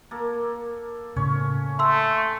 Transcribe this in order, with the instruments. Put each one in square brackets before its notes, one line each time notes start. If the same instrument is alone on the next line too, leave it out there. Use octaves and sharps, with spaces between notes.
[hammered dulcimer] A#3 A4
[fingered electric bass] A2 C#3 [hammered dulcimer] C#4 C#5
[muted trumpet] A3 [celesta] C6 E6